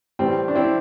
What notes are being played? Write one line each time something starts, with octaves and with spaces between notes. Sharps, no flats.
A2 E3 G3 C4
D4
C4 E4